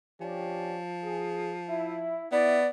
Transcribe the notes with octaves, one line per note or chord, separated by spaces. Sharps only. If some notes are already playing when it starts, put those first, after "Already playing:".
F3 C#4 D4 G4
G#4
E4
B3 E4 D5